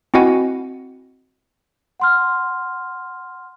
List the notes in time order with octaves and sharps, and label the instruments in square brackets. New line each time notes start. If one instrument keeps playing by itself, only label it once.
[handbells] C4 E4 F#4 D#5 F#5 G#5
[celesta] F#5 C6 F6